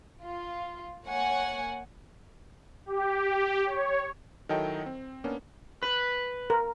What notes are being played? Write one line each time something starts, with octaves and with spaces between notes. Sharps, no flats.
F4
A#3 C#5 F#5 G#5
G4
C#5
D#3 F#3 E4 A4 D#5 G5
C4
A#3 B3 C#4 D4
B4
A#4